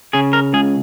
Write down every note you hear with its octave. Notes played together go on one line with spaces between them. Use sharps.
C#3 G#4
A#4
C#2 G#4